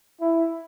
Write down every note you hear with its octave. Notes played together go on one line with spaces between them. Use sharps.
E4